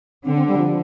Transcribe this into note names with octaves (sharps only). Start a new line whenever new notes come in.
D3 C4
C4
G3
F3